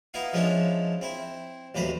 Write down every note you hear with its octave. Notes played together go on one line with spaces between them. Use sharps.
B3 D#4 E4 F5
F3 G#3 C#4 D4 E4
C4 E4
A1 D#2 F#3 B4 C5 B5